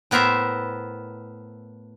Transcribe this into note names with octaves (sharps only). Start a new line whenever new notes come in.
A2 B3 A#4 C5 E5